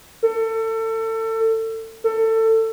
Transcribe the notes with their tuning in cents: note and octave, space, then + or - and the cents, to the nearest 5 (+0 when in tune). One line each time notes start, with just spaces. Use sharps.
A4 +30
A4 +25